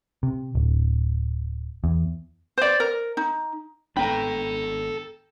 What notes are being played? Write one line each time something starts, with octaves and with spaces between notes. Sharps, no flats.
C3
D1
E2
C5 D5
A#4
D#4
G#1 B3 D4 A4 G5 A#5 B5